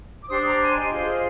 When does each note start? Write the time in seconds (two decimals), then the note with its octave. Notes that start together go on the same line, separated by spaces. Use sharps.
0.23 D6
0.29 D4 G4 C5 C6 D#6
0.44 A#5 D6
0.61 G#5 C6
0.75 D#5
0.91 F4 G#4 C5 D#5